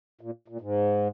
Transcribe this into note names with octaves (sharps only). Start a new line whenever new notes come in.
A#2
A#2
G#2